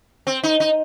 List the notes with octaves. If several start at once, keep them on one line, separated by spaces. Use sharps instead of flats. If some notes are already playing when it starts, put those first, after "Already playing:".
C4
D#4
D#4